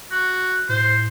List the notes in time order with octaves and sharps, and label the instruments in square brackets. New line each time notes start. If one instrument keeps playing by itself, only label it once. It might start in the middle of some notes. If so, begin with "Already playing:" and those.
[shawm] F#4
[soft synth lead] A2 [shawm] C5